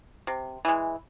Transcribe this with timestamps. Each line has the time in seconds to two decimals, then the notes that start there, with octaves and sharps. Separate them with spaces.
0.27 C3
0.65 E3 G#3